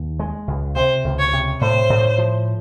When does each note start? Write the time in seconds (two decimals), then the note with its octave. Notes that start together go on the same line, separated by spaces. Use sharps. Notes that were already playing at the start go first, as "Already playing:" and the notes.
Already playing: D#2
0.19 G#3
0.48 C#2
0.76 C3 C5
1.04 C#2
1.19 C#5
1.33 C3
1.61 A2 C5
1.90 A2
2.18 F3